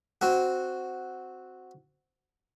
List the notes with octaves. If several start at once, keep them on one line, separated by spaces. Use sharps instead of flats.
C4 F#4